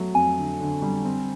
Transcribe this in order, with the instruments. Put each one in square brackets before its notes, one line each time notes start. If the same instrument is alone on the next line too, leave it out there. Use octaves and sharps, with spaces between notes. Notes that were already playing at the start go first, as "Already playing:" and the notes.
Already playing: [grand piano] F#3 A3
[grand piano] F2 [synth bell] G#5
[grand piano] D3
D3
G3
C4